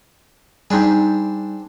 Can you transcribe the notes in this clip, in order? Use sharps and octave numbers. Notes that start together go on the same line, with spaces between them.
G3 C4 D4 D#4 G#4